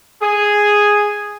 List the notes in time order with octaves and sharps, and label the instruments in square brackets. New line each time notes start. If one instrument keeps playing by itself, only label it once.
[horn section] G#4